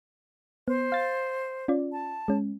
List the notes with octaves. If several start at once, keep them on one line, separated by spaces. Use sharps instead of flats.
B3 C5
F5 A6
C#4 F4 D5
A5
G#3 C#4